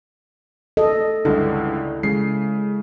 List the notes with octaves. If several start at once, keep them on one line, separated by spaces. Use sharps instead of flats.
A4 D#5
C#2 G2 D3 E4
C#3 G#3 C7